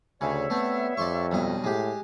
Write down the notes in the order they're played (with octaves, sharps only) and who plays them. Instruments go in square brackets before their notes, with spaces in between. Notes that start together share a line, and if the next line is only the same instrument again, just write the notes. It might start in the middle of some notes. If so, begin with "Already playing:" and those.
[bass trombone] D2 [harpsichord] C#3 [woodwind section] G3 C#5 E5
[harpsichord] A3 C4 [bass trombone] B3
[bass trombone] F2 [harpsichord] D5 C6 C#6
[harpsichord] B1 G2 D#5
[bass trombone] A2 [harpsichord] G#3 G4